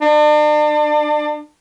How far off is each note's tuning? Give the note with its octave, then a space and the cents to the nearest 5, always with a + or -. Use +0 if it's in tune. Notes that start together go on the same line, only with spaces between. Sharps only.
D4 +35